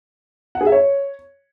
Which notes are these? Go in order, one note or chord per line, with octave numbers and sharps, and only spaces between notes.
F#5
G#4
E5
C#5